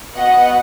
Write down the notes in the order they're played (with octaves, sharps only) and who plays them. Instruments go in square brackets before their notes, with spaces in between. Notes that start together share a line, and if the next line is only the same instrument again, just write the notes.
[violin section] B3 F#4 D#5 F#5